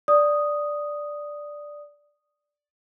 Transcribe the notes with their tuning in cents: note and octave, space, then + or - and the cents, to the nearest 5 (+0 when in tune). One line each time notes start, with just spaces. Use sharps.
D5 +0 D#6 +0